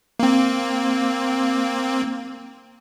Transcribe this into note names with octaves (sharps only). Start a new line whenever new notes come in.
A#3 C4